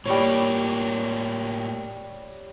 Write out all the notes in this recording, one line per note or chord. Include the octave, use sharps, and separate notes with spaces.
A2 G3 A#3 C#5